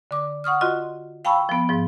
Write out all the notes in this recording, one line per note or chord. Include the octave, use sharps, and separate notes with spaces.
D3 D6
F#5 C#6 D#6 F6
F4 F#4 D#5 C6
F5 G5 A5 B5 C#6 E6
F3 B3
G#2 F3